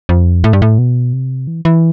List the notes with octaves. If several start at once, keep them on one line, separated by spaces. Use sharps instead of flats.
F2
A2
G2
A2
B2
C3
E3
E3